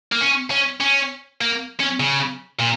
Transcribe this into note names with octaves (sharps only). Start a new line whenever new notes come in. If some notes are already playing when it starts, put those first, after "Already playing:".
A#3
C#4
C#4
C#4
A#3
C#4
C#3
A#2